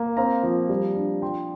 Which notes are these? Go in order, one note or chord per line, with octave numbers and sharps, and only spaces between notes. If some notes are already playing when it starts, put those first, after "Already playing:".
Already playing: A#3
C4 F5 A#5
F3
G3
D4
F3 G5 C6